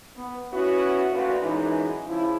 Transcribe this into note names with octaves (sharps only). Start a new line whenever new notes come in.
B3
B3 C#4 E4 F#4
D2 A#2 F4 F#4 B4
F#2 E3 G#3 D#4
C#3 F3 E4